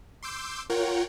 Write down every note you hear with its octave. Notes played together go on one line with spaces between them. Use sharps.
C6 D6 E6 G6
F4 A#4 C#5 F#5 G5